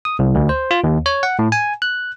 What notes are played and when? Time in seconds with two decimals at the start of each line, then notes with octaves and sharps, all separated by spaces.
0.05 D#6
0.19 C2
0.35 D2
0.49 C5
0.71 F4
0.84 D#2
1.06 C#5
1.23 F#5
1.39 A2
1.52 G#5
1.82 F#6